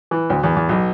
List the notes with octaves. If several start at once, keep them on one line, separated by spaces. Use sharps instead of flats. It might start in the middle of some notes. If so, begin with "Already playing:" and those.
E3
D2
E2
E2
B1